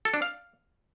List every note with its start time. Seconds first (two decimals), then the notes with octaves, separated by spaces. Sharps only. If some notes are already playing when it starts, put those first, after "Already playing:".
0.05 A4
0.14 D4
0.22 F5